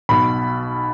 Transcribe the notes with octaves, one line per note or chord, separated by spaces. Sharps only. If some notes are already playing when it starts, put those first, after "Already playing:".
B1 B2 B5